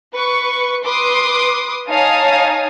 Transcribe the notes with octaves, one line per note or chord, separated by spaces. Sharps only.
B4 C#6
B4 C6 D6 D#6
D#4 C#5 F5 G#5 A5 D#6